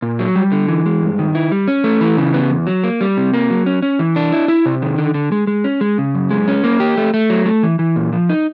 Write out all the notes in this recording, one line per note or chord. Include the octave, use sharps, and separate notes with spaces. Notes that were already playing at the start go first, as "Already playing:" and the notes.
A#2
F#3
G3
D3
E3
G#3
G2
D#3
E4
G3
C#4
A3
E3
C#3
B3
E2
F#3
A#3
G3
C3
A#3
F#3
C#4
C#4
E3
D4
E4
E4
C3
D#3
D3
D3
G#3
G#3
C#4
G#3
C#3
F#2
G#3
C#4
A#3
G4
A3
A3
F#3
A3
E3
E3
A#2
F3
D#4